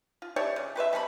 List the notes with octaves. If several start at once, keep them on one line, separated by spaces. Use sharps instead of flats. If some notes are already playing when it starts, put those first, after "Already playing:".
F4
G4 C#5 D5 E5
C#3
G4 B4 C5 E5
G3 C4 A#4 B5